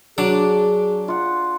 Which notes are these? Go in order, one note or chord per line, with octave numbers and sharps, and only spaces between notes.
F#3 D4 G#4 D6
F4 F#5